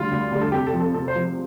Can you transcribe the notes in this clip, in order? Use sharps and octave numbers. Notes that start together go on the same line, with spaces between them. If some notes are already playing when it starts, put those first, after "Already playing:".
Already playing: D2 D3 G3 F4
D2
D3 G3
A4
C3 G4
A4
F3 C4
A4
C3 A4
C5
F3 C4